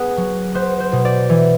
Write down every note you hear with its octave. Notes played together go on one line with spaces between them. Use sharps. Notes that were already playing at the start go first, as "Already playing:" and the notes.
Already playing: B3 G#4
F#3
B3 C5
C5
B2
D5
E3